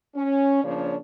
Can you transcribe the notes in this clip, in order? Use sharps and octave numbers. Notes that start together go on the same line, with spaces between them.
C#4
C#3 F3 A#3 D4 C#5 D5